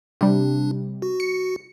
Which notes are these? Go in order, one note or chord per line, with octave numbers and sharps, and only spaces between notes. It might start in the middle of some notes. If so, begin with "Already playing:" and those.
C3 G3 D4
F#4
C#7